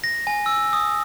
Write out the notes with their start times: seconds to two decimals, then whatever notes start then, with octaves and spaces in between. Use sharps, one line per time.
0.04 A#6
0.27 G#5
0.46 E6
0.73 D#6